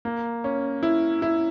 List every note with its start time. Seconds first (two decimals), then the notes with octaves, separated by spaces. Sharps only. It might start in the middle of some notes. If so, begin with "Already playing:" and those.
0.05 A#3
0.44 C#4
0.83 E4
1.22 E4